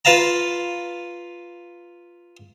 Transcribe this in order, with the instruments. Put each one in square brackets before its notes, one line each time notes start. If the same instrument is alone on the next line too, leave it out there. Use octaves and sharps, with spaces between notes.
[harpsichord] F4 B4 F5 A5 A#5